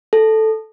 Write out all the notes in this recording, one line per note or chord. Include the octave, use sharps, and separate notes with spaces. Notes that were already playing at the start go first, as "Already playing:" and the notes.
A4